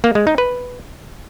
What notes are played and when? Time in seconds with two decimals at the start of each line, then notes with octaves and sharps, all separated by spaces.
0.04 A#3
0.15 G#3
0.27 D#4
0.38 B4